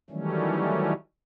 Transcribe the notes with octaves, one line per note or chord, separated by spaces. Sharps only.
D#3 E3 F#3 G3 A3 C#4